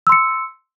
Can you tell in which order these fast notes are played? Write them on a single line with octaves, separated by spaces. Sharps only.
E6 C6 C#7